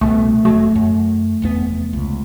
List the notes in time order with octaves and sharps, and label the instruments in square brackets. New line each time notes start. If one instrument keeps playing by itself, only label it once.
[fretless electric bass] C2 B2 B3 [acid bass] A3
[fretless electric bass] E1 F#3 [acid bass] A3
[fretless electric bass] F#2
F1 E2 B3
C#2